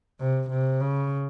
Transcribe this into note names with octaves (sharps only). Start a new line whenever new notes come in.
C3
C3
C#3